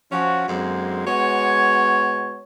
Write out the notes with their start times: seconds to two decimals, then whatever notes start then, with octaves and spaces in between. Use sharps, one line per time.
0.12 F3 C#4 F#4
0.48 F#2 D3 F#3 G#3 A#3 C4
1.06 G#3 B3 F#4 C#5